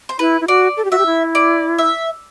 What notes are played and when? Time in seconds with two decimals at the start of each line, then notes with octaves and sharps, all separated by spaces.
0.09 C5
0.19 E4 B4
0.41 E4
0.48 F#4 D5
0.77 A4
0.85 G4
0.91 F#4 E5
0.99 G4
1.06 E4
1.35 D5
1.78 E5